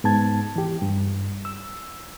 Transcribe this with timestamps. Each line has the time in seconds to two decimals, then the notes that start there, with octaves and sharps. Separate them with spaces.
0.04 G#2 B3 A5 G#6
0.56 E3 G4
0.82 G2
1.45 E6